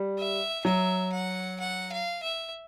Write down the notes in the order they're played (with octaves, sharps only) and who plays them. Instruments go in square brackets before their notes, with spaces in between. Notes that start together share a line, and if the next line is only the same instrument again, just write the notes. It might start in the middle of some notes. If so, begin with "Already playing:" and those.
Already playing: [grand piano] G3
[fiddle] E5
[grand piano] F#3 [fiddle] E5
[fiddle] F#5
F#5
F5
E5